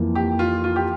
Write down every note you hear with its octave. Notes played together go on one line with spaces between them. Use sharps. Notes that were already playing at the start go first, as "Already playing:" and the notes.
Already playing: F2 E3 A#3
G4
F4
F4
G4